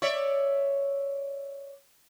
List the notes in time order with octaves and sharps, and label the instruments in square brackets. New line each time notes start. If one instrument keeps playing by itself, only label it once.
[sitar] C#5 D5 E5